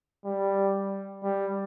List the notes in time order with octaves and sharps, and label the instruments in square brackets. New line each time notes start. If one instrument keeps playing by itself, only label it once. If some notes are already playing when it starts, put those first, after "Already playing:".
[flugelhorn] G3
G3